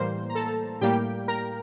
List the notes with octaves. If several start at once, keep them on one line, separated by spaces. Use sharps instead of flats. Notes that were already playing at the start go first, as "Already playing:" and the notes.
Already playing: A2 E3 G3 A#3 C5 C6
A#5
A4 A5
A2 G3 A#3 G4 G5
A#4 A#5